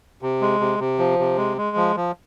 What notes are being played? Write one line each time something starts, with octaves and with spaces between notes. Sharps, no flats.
C3
G#3
C3
C3
F3
C3
G#3
G#3
F3
F3